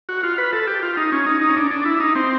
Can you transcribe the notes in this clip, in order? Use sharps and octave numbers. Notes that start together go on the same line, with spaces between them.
F#4
F4
B4
A4
G4
F4
D#4
C#4
D#4
D#4
C#4
D4
D4
E4
D#4
C4